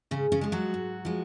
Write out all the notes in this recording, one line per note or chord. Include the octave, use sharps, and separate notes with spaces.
G#2 C#3 C#4
C#3 C#4
F3 G#3
F#3 F#4
G#2
F3 G#3